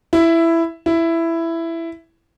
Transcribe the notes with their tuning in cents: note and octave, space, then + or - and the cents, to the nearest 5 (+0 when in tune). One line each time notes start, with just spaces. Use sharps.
E4 +10
E4 +10